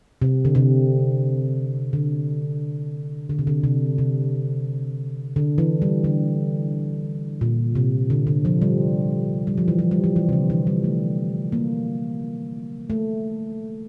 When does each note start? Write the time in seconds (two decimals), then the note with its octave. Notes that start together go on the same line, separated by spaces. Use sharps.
0.22 C3
0.45 D3
0.55 C3
1.93 D3
3.29 D3
3.39 C3
3.47 D3
3.63 C3
3.98 C3
5.36 D3
5.58 E3
5.82 G3
6.04 D3
7.41 A#2
7.75 C3
8.10 D3
8.27 D3
8.45 F3
8.62 G3
9.47 G3
9.58 F3
9.68 E3
9.79 F3
9.91 G3
10.04 F3
10.16 E3
10.29 C3
10.33 D3
10.50 E3
10.67 G3
10.84 A3
11.52 A#3
12.90 A3